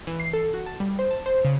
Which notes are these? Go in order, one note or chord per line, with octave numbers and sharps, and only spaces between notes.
E3
C7
A4
F#4
A5
G3
C5
A5
C5
C#3